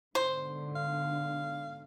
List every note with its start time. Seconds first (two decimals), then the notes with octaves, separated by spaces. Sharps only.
0.15 G#2 B2 D3 C5
0.75 F5